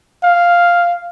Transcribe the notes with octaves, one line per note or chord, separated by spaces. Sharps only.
F5